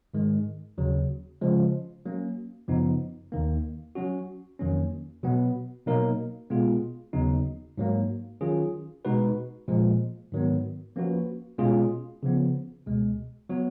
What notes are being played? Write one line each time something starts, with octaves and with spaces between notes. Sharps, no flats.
G#2 D#3 G#3
D#2 C#3 F#3
C#3 F3 G#3
F#3 A#3 C#4
F#2 C#3 F3 B3 D#4
D#2 D#3 A#3
F#3 C#4 F#4
F2 D#3 F#3 A#3 C#4
B2 F#3 B3
B2 F#3 A#3 D#4 A#4
B2 G#3 B3 F4 G#4
D#2 C#3 F#3 B3 D#4
G#2 F#3 A#3
D#3 F#3 C#4 F4 G#4
B2 G#3 D#4 F#4 B4
A#2 F3 G#3
G#2 D#3 F#3 B3
F3 A#3 C#4 F#4 B4
B2 G#3 C#4 F4 G#4
C#3 F3 B3
C#2 B2 G#3
F#3 B3 F#4